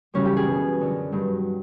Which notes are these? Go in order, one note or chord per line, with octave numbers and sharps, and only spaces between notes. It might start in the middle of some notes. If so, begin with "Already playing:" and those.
F#2 C#3 E3 G3 C#4
G4
G#4
B2 G3
F#2 D3 F#3
G2 D#3 F#3